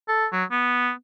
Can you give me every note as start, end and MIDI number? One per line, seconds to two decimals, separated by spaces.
0.08 0.26 69
0.32 0.44 54
0.51 0.91 59